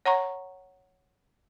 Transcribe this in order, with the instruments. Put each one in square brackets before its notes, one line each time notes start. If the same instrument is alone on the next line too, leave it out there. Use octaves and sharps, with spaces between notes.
[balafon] C#5 F#5 A#5 C#6